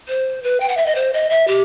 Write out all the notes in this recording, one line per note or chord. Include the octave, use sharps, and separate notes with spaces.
C5
B4
G5
F#5
E5
D#5
C5
D#5
E5
G4